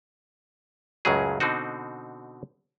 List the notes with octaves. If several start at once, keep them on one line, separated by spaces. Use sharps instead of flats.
C#2 F#2 A2 C#3 F#3 G#4
B2 D3 C4 D#4 F#4